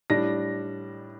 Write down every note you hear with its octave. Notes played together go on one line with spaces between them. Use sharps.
A2 G3 D4 A#6